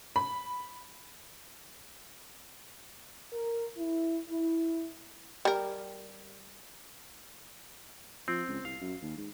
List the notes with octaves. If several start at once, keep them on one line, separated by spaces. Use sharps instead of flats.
B5
A#4
E4
E4
G3 A#4
F3 C4
C#2
C2 F5
F#2
D#2
G#2